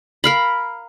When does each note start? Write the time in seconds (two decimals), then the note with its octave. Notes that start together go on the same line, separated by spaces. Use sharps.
0.24 A#4 F5 B5